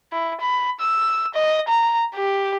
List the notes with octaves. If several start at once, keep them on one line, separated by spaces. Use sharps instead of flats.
E4
B5
E6
D#5
A#5
G4